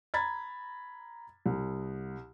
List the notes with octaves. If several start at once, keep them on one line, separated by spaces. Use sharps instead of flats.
A#5 B5 G#6 A6
C2